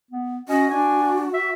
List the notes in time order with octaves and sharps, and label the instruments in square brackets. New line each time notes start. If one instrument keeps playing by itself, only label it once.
[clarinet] B3
[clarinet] C#4 [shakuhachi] F#4 [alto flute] D#5
[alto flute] D4 [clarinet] G#5
[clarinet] E5